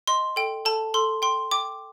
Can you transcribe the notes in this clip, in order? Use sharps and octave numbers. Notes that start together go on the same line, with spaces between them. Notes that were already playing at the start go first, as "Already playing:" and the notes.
D#5 C6
A4 G5
A4 A5
A4 C6
G5 C6
G5 D6